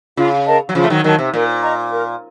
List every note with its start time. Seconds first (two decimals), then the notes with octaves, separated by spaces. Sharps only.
0.17 C#3 F4
0.47 A#4 D#5 A5
0.69 F#3
0.75 C#3 F3 F4
0.84 A3
0.90 D#3 F#3
1.04 D#3 F#3 A#4 D#5 A5
1.19 C3
1.33 A#2 A#4
1.62 D#5 A#5 C#6
1.91 A#4